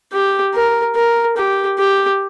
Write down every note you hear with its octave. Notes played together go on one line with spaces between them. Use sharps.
G4
A#4
A#4
G4
G4